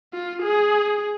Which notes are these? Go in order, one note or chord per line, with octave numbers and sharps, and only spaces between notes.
F4
G#4